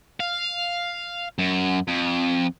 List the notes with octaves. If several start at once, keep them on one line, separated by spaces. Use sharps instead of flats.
F5
F#2
F2